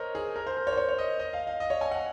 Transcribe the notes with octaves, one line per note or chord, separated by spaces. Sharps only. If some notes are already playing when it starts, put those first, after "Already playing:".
Already playing: A#4 C5 C#5 D#5
G#4
A#4
C5
A#4
C#5
C5
C#5
C#5
D#5
D#5
F5
F5
D#5
C#5
G#5
F#5